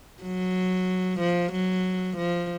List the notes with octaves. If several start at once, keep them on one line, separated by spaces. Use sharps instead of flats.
F#3
F3
F#3
F3